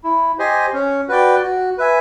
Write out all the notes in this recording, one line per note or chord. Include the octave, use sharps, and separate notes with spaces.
E4
G4 C5 D#5 G#5
C#4
F#4 B4 D5 G5
F#4
B4 E5 G#5